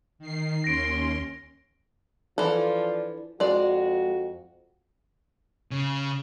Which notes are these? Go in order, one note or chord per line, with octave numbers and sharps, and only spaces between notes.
D#3 C7
D#2 C#4 C6 A#6 D7
E3 F3 D4 A4
F2 G#3 F#4 D5
C#3